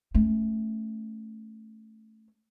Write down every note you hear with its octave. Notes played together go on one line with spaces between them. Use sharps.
A3 C#4